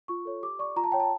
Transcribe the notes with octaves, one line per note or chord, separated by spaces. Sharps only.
F4 C#6
A4 C#5
G4 D6
D5 C#6
F4 A#5
A5
C#5 G5
A5